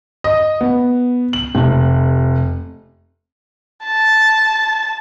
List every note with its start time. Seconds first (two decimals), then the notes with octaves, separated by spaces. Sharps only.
0.24 D#5
0.61 B3
1.33 F#7
1.55 F1
3.84 A5